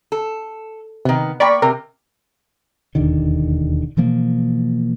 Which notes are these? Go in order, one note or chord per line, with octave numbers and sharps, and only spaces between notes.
A4
C3 D#3 B3
A#3 D5 G5 B5 C#6
C3 A#4
E1 D#2 D3 D#3
B2 E3 F3 A#3